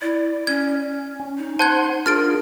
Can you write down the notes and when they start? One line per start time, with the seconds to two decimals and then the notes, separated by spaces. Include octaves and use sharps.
0.02 E4 D5
0.47 C#4 G#6
1.20 C#4
1.38 D#4
1.59 C5 F#5 A5 C6 F#6 G#6
2.06 D4 F4 G#4 A#4 F6 A6 D7